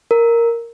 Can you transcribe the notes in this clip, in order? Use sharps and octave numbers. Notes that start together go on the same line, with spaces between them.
A#4